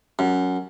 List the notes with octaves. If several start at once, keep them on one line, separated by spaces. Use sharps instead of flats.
F#2